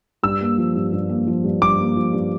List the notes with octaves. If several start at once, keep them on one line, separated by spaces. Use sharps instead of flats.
G2 E6
A#3
F3
G2
G2
A#3
F3
G2
G2 D6
A#3
F3
G2